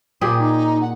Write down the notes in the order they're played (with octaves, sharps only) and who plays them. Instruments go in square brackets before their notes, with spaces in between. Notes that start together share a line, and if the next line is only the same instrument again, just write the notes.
[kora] A#2 G4 G#4 [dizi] D6
[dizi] D#4
F#5